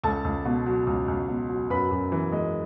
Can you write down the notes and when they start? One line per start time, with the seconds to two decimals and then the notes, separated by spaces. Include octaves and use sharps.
0.03 C#2 A4 A5
0.24 C#2
0.45 B2
0.66 F#3
0.87 C#2
1.08 C#2
1.28 B2
1.49 F#3
1.70 F#2 B4 B5
1.91 F#2
2.12 E3
2.32 G#3